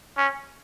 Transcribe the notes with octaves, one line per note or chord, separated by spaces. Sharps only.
C#4